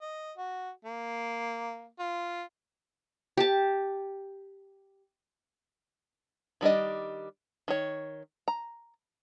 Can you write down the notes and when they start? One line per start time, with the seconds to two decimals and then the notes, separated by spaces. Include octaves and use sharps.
0.02 D#5
0.38 F#4
0.85 A#3
1.99 F4
3.37 G4 A5
6.61 D#3 G3 D4 D#5
7.68 D#3 C#5
8.48 A#5